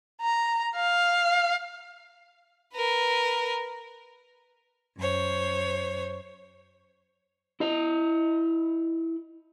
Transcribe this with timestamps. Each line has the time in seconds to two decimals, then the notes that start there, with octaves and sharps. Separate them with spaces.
0.21 A#5
0.76 F5
2.74 A#4 B4
4.97 F#2 C5 C#5
7.60 E4 D#5